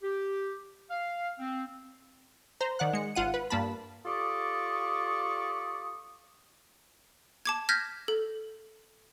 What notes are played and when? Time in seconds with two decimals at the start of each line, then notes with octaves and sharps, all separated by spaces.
0.03 G4
0.91 F5
1.39 C4
2.61 C5 A#5
2.79 D#3 D5 F#5 F#6
2.93 G#3 C#7
3.15 G#1 F4 F#5 D#7
3.34 B4
3.50 G2 A#3 A5 B5
4.05 F4 G4 A4 D5 C#6 D#6
7.45 A5 D6 G#6
7.69 F6 G6 G#6 A#6 B6
8.08 A4